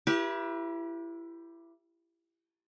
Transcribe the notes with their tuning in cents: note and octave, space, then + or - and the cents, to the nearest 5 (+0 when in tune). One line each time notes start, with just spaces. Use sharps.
E4 +25 G4 +0 B4 -40